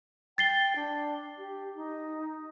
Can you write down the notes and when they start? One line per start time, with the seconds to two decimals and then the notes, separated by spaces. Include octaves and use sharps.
0.38 G5 A6 C7 G7
0.76 D4
1.38 G4
1.75 D#4